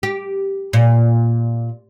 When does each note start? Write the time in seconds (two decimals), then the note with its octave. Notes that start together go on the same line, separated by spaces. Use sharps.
0.03 G4
0.73 A#2